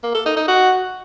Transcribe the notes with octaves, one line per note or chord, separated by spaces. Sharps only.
A#3
A4
D#4
D#4
F#4